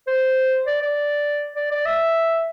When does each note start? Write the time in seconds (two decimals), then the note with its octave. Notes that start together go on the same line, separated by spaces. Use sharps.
0.07 C5
0.66 D5
0.82 D5
1.56 D5
1.71 D5
1.86 E5